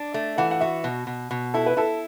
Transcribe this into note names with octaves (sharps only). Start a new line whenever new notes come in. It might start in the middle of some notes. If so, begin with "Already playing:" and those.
Already playing: D4
A3
E3 F#5
F#5
F#4 E5
B2
B2
B2
E4 A4
B4
E4 A4